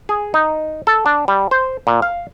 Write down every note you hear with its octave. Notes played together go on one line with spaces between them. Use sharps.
G#4
D#4
A4
D4
G3
C5
A#2
F5